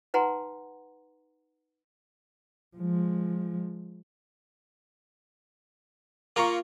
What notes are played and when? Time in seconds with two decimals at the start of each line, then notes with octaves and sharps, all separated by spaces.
0.14 D#4 B4 F#5 G#5 A#5 C6
2.76 F3 G#3
6.36 A#3 F4 A#4 F5 A#5 C#6